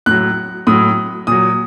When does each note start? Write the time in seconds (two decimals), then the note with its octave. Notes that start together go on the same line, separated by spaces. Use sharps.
0.06 A2 F#3 F#6
0.67 A2 F#3 D#6
1.27 A#2 F#3 D#6